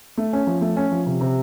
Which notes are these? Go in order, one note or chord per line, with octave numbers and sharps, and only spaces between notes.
A3
C#4
F3
A3
C#4
F3
C3
C3